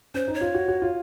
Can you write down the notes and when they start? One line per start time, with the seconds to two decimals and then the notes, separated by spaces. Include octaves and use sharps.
0.14 C#4 C5
0.28 D#4
0.34 C#5
0.41 F4
0.55 F#4
0.68 F#4
0.82 F4